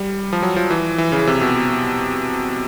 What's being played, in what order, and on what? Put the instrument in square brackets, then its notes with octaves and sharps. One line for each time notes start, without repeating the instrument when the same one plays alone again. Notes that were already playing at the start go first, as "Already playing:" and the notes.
Already playing: [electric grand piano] G3
F3
F#3
F3
E3
E3
C#3
C3
B2